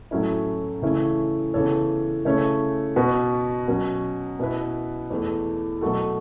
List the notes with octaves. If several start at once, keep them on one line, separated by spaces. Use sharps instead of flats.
A2 F#3 A3 C#4 E4
C#3 E3 A3 C#4 E4
C#3 E3 B3 A4 C#5
C#3 A3 C#4 E4 C#5
B2 B3 F#4 B4
B2 F#3 C#4
B2 B3 E4 B4
E2 E3 A3
B2 F#3 A3 F#4 A4